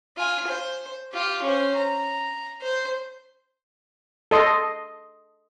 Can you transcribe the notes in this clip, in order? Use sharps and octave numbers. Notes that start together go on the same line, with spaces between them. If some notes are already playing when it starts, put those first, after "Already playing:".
F4 G#5
C5
F4 G4
C#4 C5
A#5
C5
A4 D#5 C6